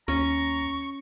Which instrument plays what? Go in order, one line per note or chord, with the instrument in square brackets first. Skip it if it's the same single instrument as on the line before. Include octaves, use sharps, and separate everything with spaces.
[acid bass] D#2 [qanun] C#4 [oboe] A#5 [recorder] C#6